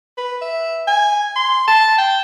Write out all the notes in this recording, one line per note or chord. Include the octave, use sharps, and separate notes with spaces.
B4
E5
G#5
C6
A5
G5